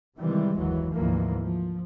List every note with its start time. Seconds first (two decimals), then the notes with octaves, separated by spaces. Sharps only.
0.18 C3 D#3 E3 G3 G#3
0.56 F#1 D#2 E3 F#3
0.93 D2 G#2 E3 F3 A#3
1.41 F3